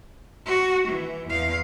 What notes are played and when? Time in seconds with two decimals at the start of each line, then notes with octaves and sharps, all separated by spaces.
0.46 F#4
0.88 E3
1.28 E2 F5